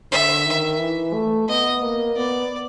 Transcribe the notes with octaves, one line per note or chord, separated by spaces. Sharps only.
D3 E5
D#3
E3
A3
B3 D#5
A#3
B3 D5